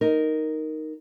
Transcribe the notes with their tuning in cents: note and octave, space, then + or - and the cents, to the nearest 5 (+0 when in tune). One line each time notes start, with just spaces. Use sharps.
D#4 +0 A#4 +0